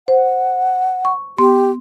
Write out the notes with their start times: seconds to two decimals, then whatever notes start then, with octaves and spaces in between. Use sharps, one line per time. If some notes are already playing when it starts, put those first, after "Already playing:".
0.08 C5 F#5
1.05 C#6
1.38 B3 G4 C6